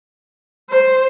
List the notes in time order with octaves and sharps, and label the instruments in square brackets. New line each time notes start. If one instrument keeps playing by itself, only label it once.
[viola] C5